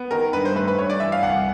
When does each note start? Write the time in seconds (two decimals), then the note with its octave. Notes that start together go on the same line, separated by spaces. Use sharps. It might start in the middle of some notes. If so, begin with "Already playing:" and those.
Already playing: B3
0.11 D#3 A#4
0.33 G2 B4
0.45 C5
0.56 A3 B4
0.68 B4
0.78 G2 C#5
0.90 D5
1.00 E3 E5
1.12 F5
1.22 C2 F#5